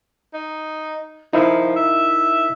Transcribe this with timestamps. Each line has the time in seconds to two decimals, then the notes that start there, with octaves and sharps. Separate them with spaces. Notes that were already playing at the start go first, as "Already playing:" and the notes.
0.34 D#4
1.33 F3 D#4 E4 A#4
1.76 E5